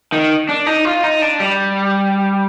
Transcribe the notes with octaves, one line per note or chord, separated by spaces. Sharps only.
D#3
D4
D#4
F4
D#4
D4
G3